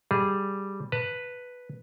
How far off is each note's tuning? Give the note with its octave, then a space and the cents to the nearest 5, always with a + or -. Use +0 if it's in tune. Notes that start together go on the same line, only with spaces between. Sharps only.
G3 +0 G#4 +0
B4 +0 A5 +40